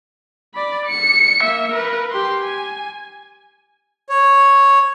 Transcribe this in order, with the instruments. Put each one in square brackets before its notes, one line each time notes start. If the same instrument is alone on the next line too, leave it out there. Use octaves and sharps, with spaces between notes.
[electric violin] D5 B5
C#7
A#3 E5
A#4 B4
G4 C6
G#5
[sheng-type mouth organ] C#5